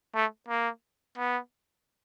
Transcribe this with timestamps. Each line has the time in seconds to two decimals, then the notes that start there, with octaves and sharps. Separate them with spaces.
0.15 A3
0.48 A#3
1.17 B3